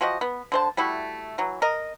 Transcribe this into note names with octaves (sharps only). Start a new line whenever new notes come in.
F3 F#4 G4 D#5
B3
D3 C5 A5
G3 A3 E4 F#4
E3 F#3
A#4 D#5